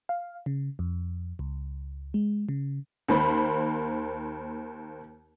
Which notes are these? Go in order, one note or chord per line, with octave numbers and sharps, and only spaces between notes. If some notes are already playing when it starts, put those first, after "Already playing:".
F5
C#3
F2
C#2
G#3
C#3
D#2 A#3 C5 B5